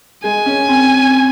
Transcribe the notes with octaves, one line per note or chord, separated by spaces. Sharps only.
G#3 G#5
C#4
C4